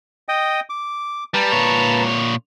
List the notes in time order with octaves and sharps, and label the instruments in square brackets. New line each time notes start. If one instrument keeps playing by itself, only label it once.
[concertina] D#5 G5 D#6
D6
[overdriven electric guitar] G3 [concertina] B4 A5 A#5
[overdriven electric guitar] A#2 C#5